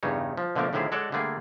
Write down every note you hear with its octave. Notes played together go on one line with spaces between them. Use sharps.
E2 G2 C#3 D#4 C#5
F3
B2 D3 F3 A3 A#3 A#4
A2 D3 D#3 F3 E4 G#4
G#3 F#4 A4 C#5 D5
D3 G3 A3 A#3 G#4